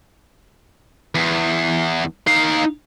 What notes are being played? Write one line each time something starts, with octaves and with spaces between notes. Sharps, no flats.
E2
D#4 F5